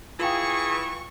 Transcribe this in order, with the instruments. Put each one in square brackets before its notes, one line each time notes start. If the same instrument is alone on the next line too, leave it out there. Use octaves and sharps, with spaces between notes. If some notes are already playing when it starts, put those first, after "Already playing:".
[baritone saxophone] E3 [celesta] F4 F5 G5 [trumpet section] G#4 [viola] C#6